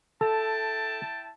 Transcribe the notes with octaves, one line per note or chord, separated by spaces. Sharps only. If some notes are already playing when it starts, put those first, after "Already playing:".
E4 A4 G5 A5